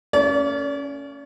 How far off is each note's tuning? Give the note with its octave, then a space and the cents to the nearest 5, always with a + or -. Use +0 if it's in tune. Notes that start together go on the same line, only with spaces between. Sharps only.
A#3 -45 C#4 +10 D5 -40